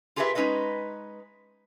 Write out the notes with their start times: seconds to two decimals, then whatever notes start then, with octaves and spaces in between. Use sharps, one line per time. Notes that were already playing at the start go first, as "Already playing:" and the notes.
0.16 F4 G4 G#4 A#4 B4 E5
0.35 G#3 C#4 D#4 B4 D#5